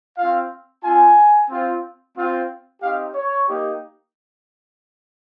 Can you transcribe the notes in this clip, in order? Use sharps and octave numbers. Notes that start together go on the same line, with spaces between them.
C4 F4 F5
C4 F4 G#5
C4 F4
C4 F4
C4 D#4 G4 F5
C#5
A#3 D#4 G4